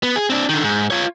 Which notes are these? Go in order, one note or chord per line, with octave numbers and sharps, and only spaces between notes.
B3
G#4
C4 D4
D3 D#3
G#2
F4 C#5